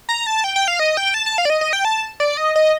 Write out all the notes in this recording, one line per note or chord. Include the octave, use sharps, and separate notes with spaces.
A#5
A5
G5
G5
F5
D#5
G5
A5
A5
F5
D5
D#5
D#5
G5
A5
D5
D#5
D#5